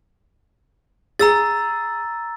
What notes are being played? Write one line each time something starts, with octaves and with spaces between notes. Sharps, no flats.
G#4 A#5 E6 A6